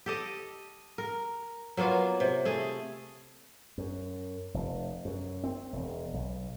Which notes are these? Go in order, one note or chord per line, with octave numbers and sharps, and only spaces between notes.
G4 A4 D#5
A#4
F#3 A#3 B3 F4
C3
A3 G#4
F#2
F1
F#2
C4
E1
B1